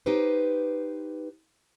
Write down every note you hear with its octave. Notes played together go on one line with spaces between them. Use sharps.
D#4 G4 B4 C5